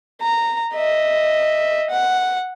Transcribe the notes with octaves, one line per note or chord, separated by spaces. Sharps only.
A#5
D#5 E5
F#5